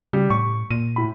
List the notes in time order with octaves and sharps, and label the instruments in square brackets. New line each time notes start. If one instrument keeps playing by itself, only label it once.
[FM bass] C#3 [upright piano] G3
[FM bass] A2 [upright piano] C#6
[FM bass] A#2 [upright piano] D#7
[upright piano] A2 B5